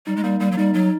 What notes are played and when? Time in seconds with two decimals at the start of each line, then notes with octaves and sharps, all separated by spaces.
0.07 G3 D#4
0.16 G#3
0.24 G3 A#3
0.40 G3 A#3
0.51 F#3
0.57 G3 D#4
0.74 F#3 D#4